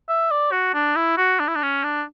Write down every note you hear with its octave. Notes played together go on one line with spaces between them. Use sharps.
E5
D5
F#4
D4
E4
F#4
D4
E4
D4
C#4
D4